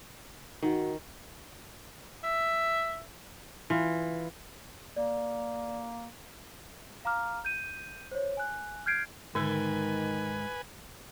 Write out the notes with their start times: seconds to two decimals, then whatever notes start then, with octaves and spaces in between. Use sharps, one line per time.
0.62 D#3 F#4
2.24 E5
3.70 E3 F4
4.96 A#3 D5
7.05 F5 A#5 D6 F6
7.45 G6 D#7
8.11 C5 C#5
8.37 G#5 F#6
8.86 F6 G6 G#6 C7 D7
9.35 G#2 D3 D#3 G#3 B4 G#5